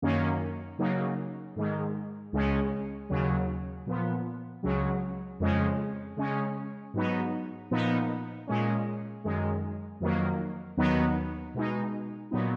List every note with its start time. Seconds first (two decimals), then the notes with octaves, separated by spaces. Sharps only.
0.02 F#2 D#3 A#3 C#4
0.79 C#3 F#3 A#3 D#4
1.56 G#2 D#3 G#3
2.32 C#2 C#3 G#3 C#4
3.09 D#2 C#3 F#3
3.86 A#2 F3 B3
4.63 C#2 C#3 F#3
5.40 F2 C#3 G#3 C#4
6.17 C#3 G#3 C#4
6.94 G#2 F#3 B3 D#4
7.71 A#2 F3 B3 D#4
8.47 A#2 G#3 C#4
9.24 F#2 D#3 G#3
10.00 F2 D#3 F#3 A#3
10.77 D#2 D#3 F#3 B3 D#4
11.54 B2 G#3 D#4
12.31 A#2 F#3 B3 D#4